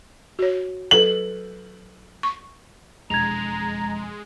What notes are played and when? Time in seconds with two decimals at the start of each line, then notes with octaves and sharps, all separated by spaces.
0.39 F#4 C#5
0.91 F#3 A4 B4 F#7
2.23 C#6
3.10 E1 F2 G#3 A#5 G#6 F7